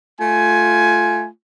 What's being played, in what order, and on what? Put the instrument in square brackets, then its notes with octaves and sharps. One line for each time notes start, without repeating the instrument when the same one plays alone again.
[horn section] A3 F4 G#5